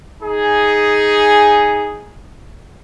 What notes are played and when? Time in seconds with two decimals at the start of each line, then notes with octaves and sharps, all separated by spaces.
0.23 D#4 G#4